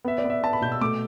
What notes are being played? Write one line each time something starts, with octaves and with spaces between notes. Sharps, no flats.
B3 E5
D5
B3
E5
B3 A5
B5
B2 G6
E6
A3 D6